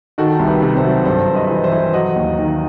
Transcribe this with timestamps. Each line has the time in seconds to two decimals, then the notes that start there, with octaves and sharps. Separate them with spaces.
0.18 D#3 F#4 A4
0.40 C2
0.47 G4 B4
0.62 C3
0.76 A4 C5
0.84 F#3
1.05 G2 A4 C5
1.28 G2
1.35 B4 D#5
1.49 E3
1.64 C5 E5
1.72 E3
1.94 F#3 D#5 F#5
2.16 D#2
2.38 D#3